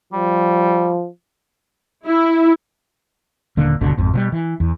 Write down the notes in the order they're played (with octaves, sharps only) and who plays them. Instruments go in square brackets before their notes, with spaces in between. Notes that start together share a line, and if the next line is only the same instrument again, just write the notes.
[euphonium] F3 [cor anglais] G3
[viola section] E4
[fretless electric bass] D#1 D3 A#3
F#1 C#2 B2 D3
G#1 F2
B2 F#3 G3
E3
E2